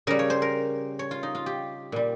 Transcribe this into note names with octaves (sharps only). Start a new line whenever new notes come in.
C#3 G3 A#4
C#5
C5
A#4
C#5
F4
D#4
F4
G4
A#2 G3